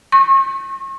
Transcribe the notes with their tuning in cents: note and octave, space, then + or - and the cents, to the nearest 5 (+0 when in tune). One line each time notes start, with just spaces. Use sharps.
C#6 -40